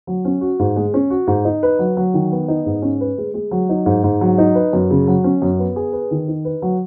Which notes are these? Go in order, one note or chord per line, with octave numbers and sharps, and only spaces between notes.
F#3
C#4
F#4
G#2
G#3
C#4
F#4
G#2
D#4
B4
F#3
F#3
D#3
B3
D#4
G#2
C#4
B4
G#3
G#3
F#3
D#4
G#2
G#2
F#3
D#4
B4
F#2
C#3
F#3
C#4
F#2
B3
G#4
B4
D#3
D#4
B4
F#3